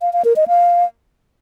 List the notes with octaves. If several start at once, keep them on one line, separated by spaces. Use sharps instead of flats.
F5
F5
A#4
D#5
F5